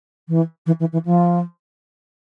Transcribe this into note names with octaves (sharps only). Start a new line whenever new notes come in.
E3
E3
E3
E3
F3